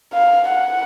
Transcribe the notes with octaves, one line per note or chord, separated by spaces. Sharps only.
F5
F#5